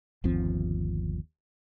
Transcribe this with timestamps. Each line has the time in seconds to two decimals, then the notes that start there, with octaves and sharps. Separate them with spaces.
0.24 G1 D#2 F3 C4